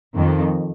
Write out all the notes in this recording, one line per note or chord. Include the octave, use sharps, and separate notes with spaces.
F2 D#3